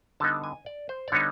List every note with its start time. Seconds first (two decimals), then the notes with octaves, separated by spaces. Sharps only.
0.20 D3 G3 B3 D#4 A5
0.44 G#5
0.66 D5
0.89 C5
1.08 D5
1.12 D3 G3 B3 D#4 C#5